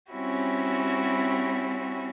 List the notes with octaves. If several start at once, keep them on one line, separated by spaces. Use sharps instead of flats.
G3 C4 C#4 E4 F#4 G4